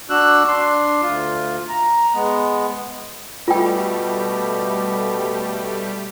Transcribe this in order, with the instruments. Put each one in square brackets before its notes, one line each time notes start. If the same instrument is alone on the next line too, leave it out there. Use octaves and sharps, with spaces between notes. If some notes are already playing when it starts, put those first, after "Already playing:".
[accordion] D4 F#4 E6 F#6
D4 C6
D2 F4
A#5
G#3 B3
[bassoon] B2 [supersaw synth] G3 A3 G4 [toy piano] F4 G5